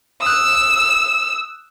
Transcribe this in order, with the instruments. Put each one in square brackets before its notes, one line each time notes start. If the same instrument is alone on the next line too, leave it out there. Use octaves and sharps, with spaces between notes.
[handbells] D#6 F#6 [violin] E6